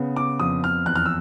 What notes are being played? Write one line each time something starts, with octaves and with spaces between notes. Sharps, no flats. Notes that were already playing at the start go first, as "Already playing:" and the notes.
Already playing: C#3 B3
D6
F2 D#6
F6
E2 F#6
F6
E6